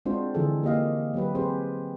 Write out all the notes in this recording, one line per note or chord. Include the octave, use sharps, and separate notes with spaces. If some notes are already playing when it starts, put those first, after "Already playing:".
G#3 C4 D4 F4 F#4 C5
D3 E3 F3 G#4 A4
A#3 G4 D#5 F5
F#3 B3 G4 B4
C4 G4 G#4 B4 C5